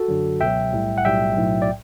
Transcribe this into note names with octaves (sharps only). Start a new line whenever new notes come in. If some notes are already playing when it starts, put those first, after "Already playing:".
Already playing: F#4 A4
F#2 D3 F#3
C#2 B2 F#3 E5 G5
B1 A2 G3
F#5
B1 A2 G3 E5 G5
B1 A2 F#3
D5